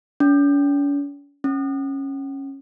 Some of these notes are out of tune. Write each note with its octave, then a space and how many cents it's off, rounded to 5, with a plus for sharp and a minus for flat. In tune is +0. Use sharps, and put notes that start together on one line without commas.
C#4 +45
C#4 -15